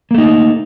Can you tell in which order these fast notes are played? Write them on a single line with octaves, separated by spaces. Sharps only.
A#3 A3 D#4